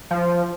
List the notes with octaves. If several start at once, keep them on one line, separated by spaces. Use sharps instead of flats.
F3